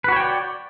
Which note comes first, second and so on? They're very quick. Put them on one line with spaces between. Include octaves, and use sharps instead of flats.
B4 F#4 C#5 G5 D5